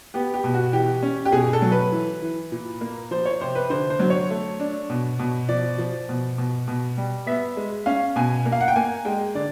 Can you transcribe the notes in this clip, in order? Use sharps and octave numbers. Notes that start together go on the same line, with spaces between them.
B3 G4
G4
B2
F#4
E3 G4
C#4
G4
B2 G#4
A4
F#3
B4
E3
E3
A#2
A#3
F3 C5
C#5
C3 C5
B4
D3 C5
C5
F#3
C#5
A3
D4
B2
B2
F3 D5
F3
B2
B2
B2
G3
B3 E5
G#3
C#4 F5
B2 G#5
A#3
F5
F#5
G5
A#3 G#5
G#3 G5
D3 D5